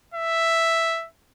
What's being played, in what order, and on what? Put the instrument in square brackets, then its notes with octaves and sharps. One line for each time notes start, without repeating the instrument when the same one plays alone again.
[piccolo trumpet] E5